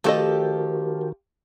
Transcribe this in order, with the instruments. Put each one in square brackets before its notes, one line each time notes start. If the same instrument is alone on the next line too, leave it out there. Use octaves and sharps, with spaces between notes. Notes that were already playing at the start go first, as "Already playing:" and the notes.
[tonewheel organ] D#3 F#4 A#4 [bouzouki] F3 G4 [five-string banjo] A3 A4 D#5